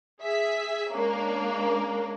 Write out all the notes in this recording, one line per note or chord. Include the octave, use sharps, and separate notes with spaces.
G#4 E5 B6
G#3 A#3 C#4 D4 A#4